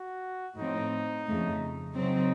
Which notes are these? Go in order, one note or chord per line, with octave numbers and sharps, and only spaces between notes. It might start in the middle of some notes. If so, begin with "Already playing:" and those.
Already playing: F#4
A2 F3 C4 D#4
F2 C#3 A3
C#3 F#3 C4 D#4